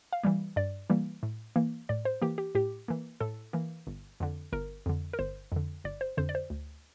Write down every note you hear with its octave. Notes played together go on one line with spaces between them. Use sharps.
F5
E3 G3 A#3
G2 D5
E3 G3 A#3
A2
E3 A#3
A2 D5
C5
E3 A#3 G4
G4
A2 G4
E3 A#3
A2 A4
E3 A#3
G1
F2 D3
G1 A#4
F2 D3
A#4
G1 C5
F2 D3
G1 D5
C5
F2 D3 C5
D5
C5
D2